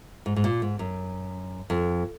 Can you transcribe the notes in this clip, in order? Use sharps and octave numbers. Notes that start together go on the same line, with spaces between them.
G#2
G#2
A#2
G#2
F#2
F2